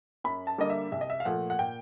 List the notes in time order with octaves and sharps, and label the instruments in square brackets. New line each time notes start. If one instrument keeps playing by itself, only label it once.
[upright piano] F#2 B5
A5
D3 G3 A#3 D#5
E5
C2 E5
D#5
E5
F5
A#2 F3 A3 F#5
F#5
A#2 G5